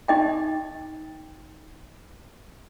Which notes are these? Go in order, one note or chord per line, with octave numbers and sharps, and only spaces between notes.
D#4 D#5 G5